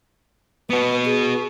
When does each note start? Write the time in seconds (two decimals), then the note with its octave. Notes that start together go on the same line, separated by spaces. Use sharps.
0.70 B3 F#4 B4
1.05 G#4